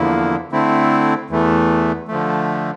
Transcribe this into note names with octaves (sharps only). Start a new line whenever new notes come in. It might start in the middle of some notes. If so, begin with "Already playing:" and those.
Already playing: E2 D3 F3 A#3 E4
D3 A3 C4 E4
E2 E3 A3
D3 F3 A3